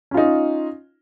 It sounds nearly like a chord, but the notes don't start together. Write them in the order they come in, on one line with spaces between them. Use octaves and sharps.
C#4 F4 D#4